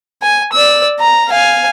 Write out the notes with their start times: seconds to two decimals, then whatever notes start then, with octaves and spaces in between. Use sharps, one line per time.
0.22 G#5
0.53 D5 E6
0.99 A#5
1.29 F5 G#5